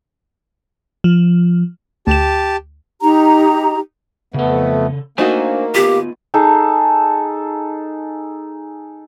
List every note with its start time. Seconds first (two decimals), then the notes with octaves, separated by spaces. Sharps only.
1.04 F3
2.07 D2 G4 A5 E7
3.02 D#4 G4 A#5
4.34 F2 C#3 A3 B3 A4
5.18 A3 A#3 D4 D#4 F#4 C5 G#5
5.75 B3 F4 G4
6.34 D#4 G#4 A4